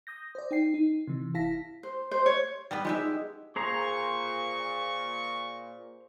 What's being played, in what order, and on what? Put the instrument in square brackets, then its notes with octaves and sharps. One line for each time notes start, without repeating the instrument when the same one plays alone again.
[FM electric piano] D#6 G6 A#6
C5 D5
D#4 G5 C7
D#4
C3 E3
G1 E4 F5 A5 A#6 B6
[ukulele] C5
C5
C#5
[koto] G3 B3 B4
[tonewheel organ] F3 D#4 [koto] G#3 G4 E5
[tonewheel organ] D#4 G#4
[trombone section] A#2 [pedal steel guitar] G#4 C5 A#5 [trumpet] C#6